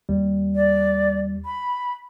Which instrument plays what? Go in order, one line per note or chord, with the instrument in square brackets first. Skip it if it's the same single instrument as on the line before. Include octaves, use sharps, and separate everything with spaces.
[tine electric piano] D#2 G3
[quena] D5
B5